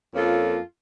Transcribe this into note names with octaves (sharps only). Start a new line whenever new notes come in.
F2 A#3 C#4 F4 A4